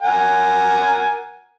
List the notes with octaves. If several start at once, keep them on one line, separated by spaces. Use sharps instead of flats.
A#4 F#5 G#5